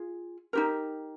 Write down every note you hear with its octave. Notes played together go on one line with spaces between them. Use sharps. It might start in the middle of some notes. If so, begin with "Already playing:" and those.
Already playing: F4 G#4
D#4 G4 A#4